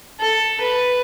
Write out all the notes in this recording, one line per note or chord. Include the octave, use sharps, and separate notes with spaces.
A4
B4